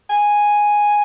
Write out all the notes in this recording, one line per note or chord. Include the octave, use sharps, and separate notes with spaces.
G#5